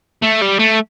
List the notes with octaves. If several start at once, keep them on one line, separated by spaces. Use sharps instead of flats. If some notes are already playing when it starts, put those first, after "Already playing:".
A3
G3
A3